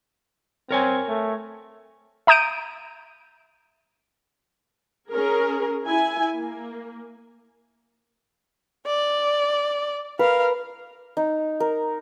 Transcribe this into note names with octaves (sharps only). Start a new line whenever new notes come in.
C4 A#4 C#5 G#5
A3
E5 A#5 D#6 G6 D7 D#7
C#4 G#4 A#4
E4 G#5
A#3
D5
A#4 B4 F5
D#4
A#4